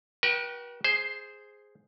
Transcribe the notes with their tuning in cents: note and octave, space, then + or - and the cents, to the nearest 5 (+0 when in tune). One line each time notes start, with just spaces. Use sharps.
F#4 +30 B4 -45 G5 +0
G#4 +0 C5 +0